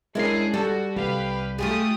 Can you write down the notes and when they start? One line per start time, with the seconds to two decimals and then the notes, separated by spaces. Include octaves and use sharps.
0.15 G#3 C#4 D4 E4 G#4 A#4 C7
0.54 G3 F#4 A4
0.96 C2 G4 B4 F5
1.58 A3 F4 G4 G#4 D#6